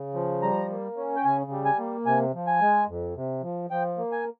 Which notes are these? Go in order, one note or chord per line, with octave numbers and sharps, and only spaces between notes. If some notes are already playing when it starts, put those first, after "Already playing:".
Already playing: C#3
F3
G3 A#5
A#3
C#4
G5
C#3 G#5
G3
G#5
A#3
C3 G#5
F3
G#5
G#3
F2
C3
F3
F3 G5
A#3
G#5